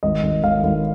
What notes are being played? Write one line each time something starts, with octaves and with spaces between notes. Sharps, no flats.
G#1 D#5
G#1
G#1 F5
G#1